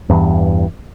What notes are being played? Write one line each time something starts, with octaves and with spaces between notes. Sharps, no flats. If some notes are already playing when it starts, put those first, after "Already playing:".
E2 G2 E3